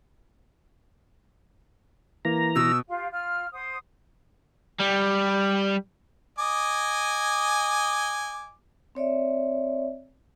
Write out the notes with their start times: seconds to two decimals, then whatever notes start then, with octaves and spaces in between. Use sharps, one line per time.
2.25 E3 A#3 A#5
2.56 B2 E6
2.88 F4 G4 F5
3.11 F4 F6
3.53 C5 F#5 D#6
4.80 G3
6.39 D#5 G#5 D6
8.95 C4 C#5 D5 E5